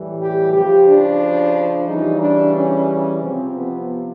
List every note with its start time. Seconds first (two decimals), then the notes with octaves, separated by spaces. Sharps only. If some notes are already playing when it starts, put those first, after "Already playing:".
Already playing: A2 E3 G3
0.20 G4
0.53 C#3 F3 G4
0.87 D4
1.87 C#3 E3 G3 D#4
2.21 D4
2.55 C#4
3.22 C3 F3 C4
3.56 B3